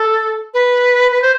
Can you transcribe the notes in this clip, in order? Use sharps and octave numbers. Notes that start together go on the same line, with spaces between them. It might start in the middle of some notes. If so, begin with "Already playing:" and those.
Already playing: A4
B4
B4
C5